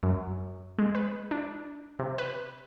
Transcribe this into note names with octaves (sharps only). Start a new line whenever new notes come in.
F#2
G#3
B4
D4
C3
B4